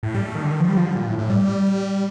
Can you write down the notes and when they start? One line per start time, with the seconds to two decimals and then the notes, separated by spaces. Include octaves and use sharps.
0.03 A2
0.15 G3
0.26 A3
0.35 D#3
0.43 D3
0.51 D#3
0.60 F3
0.69 G3
0.77 F3
0.86 D3
0.95 A#2
1.07 A2
1.18 A2
1.30 G3